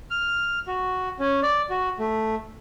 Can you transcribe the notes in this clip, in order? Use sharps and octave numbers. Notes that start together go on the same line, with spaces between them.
F6
F#4
C#4
D5
F#4
A3